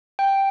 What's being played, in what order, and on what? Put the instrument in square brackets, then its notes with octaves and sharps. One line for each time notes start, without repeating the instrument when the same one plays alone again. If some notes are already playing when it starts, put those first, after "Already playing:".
[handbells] G5